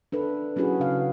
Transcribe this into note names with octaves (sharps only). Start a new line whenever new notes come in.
D4 A4 B4
F#3 C#4 E4 F#4 G#4 B4
C#3 F5